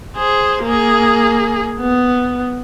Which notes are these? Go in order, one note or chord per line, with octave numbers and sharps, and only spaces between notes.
G#4 C5
A#3 G#4
B3